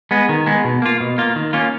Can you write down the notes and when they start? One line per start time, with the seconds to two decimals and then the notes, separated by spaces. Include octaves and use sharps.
0.11 G#3 B3
0.29 D#3
0.46 G#3 B3
0.64 B2
0.82 A#3 F4
1.01 B2
1.18 A#3 F4
1.36 D#3
1.53 A#3 C#4 F4